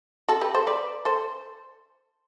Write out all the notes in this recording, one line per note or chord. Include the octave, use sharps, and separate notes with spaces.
F#4 A4
G4 B4
A4 C5
B4 D5
A4 C5